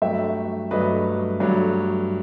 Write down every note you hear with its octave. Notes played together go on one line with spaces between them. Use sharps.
G2 F#3 A3 E5 G5
G2 F#3 A3 B4 D#5
G2 F#3 A3